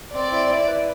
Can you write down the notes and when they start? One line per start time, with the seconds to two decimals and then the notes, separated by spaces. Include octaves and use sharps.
0.14 C4 D5
0.32 E4
0.50 E4
0.67 B4